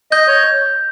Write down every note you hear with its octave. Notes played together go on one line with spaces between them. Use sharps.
D#5 G6
C#5